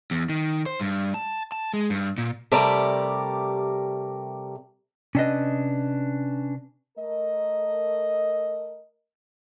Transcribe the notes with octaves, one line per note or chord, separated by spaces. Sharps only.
E2
D#3
C5
G2
A5
A5
G#3
G2
A#2
C3 G3 A3 G4 A#4 D5
C3 C#4 D4 B4 D#5
A3 A#4 D#5